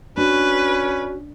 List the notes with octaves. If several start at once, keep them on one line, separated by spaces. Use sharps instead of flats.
C#4 D4 F#4 B4